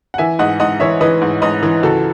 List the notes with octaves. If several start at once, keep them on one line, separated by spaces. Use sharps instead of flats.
F#5
E3 E5 G#5
G#2 D#5 F#5
G#2 D#5 F#5
E3 C#5 E5
E3 B4 D#5
G#2
G#2 B4 D#5
E3
C#2 F#4 A4